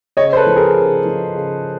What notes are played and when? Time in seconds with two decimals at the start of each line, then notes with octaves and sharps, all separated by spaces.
0.17 C#3 C#5 D#5
0.33 C5
0.37 A4 B4
0.46 F3
0.56 G#4 A#4
0.76 C#3
1.05 F3
1.35 C#3